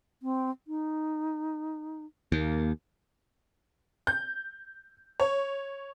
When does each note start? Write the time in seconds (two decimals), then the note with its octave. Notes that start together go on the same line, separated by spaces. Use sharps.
0.23 C4
0.67 D#4
2.32 D#2 A#3
4.07 G6
5.20 C#5